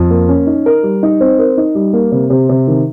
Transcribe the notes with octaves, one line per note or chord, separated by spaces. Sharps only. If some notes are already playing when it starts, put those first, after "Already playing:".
Already playing: F2
A#3
C#4
D#4
A#4
G3
D#4
C4
A#4
D#4
G3
A#3
C3
C3
C3
D#3